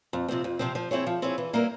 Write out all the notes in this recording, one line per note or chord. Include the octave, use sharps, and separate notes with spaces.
F2
C3 F3 C4
F2
C3 F3 C4
F3
C4 E4 G#4 C#5
F3
C4 E4 G#4 C#5
E3
G3 A#3 E4 A#4